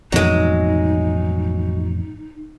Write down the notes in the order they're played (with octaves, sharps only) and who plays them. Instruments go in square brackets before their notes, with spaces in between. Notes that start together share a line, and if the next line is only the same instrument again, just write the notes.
[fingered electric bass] A1 F2 B2 [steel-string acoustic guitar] F#3 G#3 [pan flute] D#4